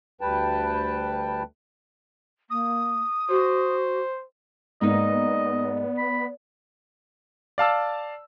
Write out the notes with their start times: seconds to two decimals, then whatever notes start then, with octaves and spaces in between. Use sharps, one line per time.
0.21 D2 G3 B4 G5 A5
2.50 A#3 D#6
3.30 F#4 C5
4.81 G#2 A#3 B3 D#4 D5 D#5
5.98 B5
7.58 D5 F5 A5 E6